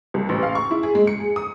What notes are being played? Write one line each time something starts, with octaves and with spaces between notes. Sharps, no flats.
C2
A1
F5
C#6
E4
G#4
G#3
C#7
G#4
D#6